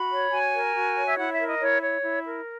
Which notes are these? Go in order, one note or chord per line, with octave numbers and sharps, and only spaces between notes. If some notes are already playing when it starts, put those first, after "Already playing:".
Already playing: F#4 B5
C#5
F#4 G#5
A#4
F#4
C#5
E5
E4 F#5
E5
A#4
D#5
E4 C#5
C#5
E4
A#4